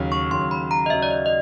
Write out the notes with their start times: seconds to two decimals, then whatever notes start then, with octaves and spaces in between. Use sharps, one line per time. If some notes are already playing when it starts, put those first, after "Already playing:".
Already playing: D#2 C#3 F#3
0.12 C#6
0.31 D#2 C#3 F#3 C6
0.51 B5
0.71 A#5
0.86 D#5
0.90 D#2 C#3 F#3 E5
1.03 D5
1.10 D#5
1.26 D#5